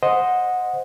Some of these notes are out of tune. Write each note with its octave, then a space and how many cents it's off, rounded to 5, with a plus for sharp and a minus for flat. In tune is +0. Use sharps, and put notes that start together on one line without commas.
C5 -5 D#5 +0 F#5 -15